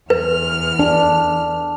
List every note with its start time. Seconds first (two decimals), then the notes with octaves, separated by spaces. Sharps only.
0.10 E2 B4 F6
0.79 D4